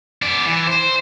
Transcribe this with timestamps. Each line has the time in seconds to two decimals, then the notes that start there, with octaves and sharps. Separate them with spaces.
0.22 B3 D5
0.46 E3
0.67 C5